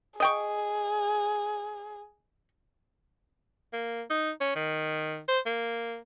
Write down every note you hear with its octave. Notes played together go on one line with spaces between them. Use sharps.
G#4 D#5 G5 C#6
A#3
D#4
C#4
D#3
C5
A#3